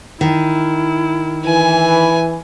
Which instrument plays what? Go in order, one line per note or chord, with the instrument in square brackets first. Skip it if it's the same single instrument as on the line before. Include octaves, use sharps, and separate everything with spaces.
[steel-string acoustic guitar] D#3 [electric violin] E4
[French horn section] E3 [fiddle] G#5